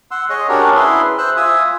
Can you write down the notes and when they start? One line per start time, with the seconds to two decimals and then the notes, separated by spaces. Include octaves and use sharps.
0.11 F#5 C6 E6
0.30 G#4 C#5 D#5
0.49 C#4 D4 F#4 G4 A#4 C#5
0.75 E4 G#4 B4 E5 C6
1.18 C5 E6 F#6
1.37 F4 E5 G#5 D#6 E6